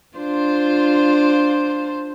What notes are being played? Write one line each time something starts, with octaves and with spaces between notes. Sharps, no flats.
D4 F4 C5